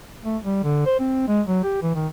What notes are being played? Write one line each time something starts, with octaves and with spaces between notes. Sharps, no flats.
A3
G3
D3
C5
C4
G#3
F#3
G4
E3
D#3